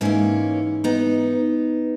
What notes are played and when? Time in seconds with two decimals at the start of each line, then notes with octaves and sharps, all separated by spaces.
0.01 G#2 E3 A#3 C#4
0.84 B3 D#4